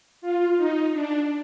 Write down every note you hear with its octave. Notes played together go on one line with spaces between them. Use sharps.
F4
D#4
D4